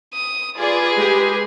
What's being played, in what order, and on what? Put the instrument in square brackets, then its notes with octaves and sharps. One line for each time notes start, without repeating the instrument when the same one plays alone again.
[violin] D#6
[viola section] F4 D5 G#5 [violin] G#4 B4
[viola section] G#3 G4